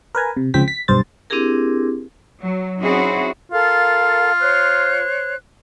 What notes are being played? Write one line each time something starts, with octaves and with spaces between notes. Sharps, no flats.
A#4 B4 G#5 A#5
C3
C#2 C#3 F3 C4 G5 B6
B6
B1 G2 C5 A6
C4 D4 E4 G4 G#4 A#4
F#3
C4 C#4 D#4 E4 F#4 G#4
F4 A4 A#4 F5
C5 C#5 F#6